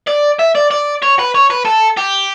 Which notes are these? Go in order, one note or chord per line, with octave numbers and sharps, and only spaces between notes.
D5
E5
D5
D5
C#5
B4
C#5
B4
A4
G4